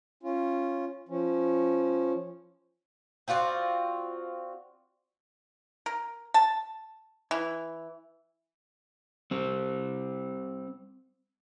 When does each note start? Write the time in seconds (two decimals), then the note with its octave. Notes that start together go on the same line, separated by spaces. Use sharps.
0.23 C#4 F4
1.09 F3 C#4
3.28 C4 F4 F#4 D5
5.86 A#4
6.34 A5
7.31 E3
9.31 G3 C4